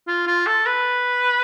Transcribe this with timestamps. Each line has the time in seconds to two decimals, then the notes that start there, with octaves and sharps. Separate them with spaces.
0.07 F4
0.27 F4
0.47 A4
0.66 B4